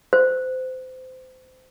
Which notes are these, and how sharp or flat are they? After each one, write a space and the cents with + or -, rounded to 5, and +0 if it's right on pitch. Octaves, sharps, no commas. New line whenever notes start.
C5 -25